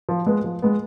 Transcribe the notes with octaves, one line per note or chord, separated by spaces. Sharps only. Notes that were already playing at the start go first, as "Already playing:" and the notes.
F3
G#3 B3
F3
G#3 B3